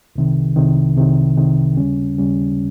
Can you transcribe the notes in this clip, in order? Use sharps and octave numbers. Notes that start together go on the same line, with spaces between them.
C2 C3 D#3
C2 C3 D#3
C2 C3 D#3
C2 C3 D#3
D#2 C#3 G3 C#4
D#2 C#3 G3 C#4